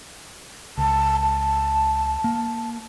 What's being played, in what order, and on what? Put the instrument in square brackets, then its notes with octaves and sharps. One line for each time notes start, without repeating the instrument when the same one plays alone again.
[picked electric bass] C#2 [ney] A5
[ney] A5
[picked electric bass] A#3